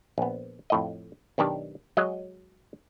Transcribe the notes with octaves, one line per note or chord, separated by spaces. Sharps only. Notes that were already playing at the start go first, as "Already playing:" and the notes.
A#1 B3
F2 A2 D#5
B1 D#3 D4 G4
F#3 G#3 D#5